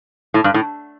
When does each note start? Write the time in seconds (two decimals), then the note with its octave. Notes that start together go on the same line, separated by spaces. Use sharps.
0.34 A2
0.44 G2
0.54 A2